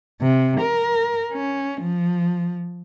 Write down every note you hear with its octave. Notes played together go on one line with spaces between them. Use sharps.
C3
A#4
C#4
F3